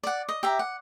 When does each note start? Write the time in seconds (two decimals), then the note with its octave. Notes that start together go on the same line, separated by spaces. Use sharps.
0.03 D5 F#5
0.29 D#5
0.43 G4 E5 A#5
0.59 F#5